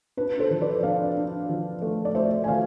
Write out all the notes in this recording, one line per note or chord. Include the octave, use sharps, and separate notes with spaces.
D4 B4
A4 C5
F3
B4 D5
D4 D5 F5
D4
F3
A3
D5
A3 C5 E5
G#5
F3 D5 F5